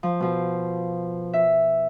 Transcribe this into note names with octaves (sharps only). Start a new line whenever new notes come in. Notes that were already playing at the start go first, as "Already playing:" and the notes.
F3
B2 F3
E5